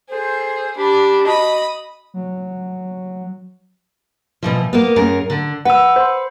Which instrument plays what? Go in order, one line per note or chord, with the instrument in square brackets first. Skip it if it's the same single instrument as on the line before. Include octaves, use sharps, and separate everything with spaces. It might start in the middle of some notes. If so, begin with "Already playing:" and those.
[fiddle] G#4 [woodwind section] A4 C5
[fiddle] D4 [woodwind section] G4 B5
[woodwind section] F#4 D#5 [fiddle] B5 D#6
[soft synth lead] F#3
[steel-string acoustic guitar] B2 E3 F3
A#3 B3
F#2 G#4 A#4
D3
[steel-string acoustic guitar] B4 [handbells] F#5 E6
[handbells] C5 C6